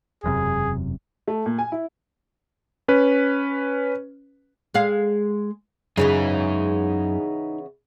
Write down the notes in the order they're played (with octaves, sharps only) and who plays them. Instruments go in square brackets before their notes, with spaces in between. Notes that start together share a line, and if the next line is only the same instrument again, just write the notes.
[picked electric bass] E1 F#2 C3 [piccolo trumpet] G#4
[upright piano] A3
A#2
G#5
E4
[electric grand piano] C#4 B4
[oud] G#3 G#4 F5
[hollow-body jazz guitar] F#2 [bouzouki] C#3 E3 B3 [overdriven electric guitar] D#4 G#4